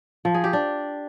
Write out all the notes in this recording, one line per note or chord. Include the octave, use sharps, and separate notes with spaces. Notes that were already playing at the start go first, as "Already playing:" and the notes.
F3
G#4
G4
D4